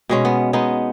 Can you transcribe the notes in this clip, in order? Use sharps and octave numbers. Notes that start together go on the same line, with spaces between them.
B2 G#3 C#4
B3
G#3 B3 D#4